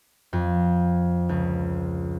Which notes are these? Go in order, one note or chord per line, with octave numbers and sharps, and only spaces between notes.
F2
C#2